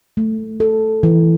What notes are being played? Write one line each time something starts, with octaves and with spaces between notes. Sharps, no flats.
A3
A4
E3